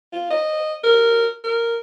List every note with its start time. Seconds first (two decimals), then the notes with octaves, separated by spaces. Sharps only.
0.13 F4
0.30 D#5
0.84 A#4
1.44 A#4